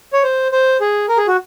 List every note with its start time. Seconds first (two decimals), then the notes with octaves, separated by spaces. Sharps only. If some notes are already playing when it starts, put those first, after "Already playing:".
0.13 C#5
0.23 C5
0.52 C5
0.81 G#4
1.08 A#4
1.17 G#4
1.27 F#4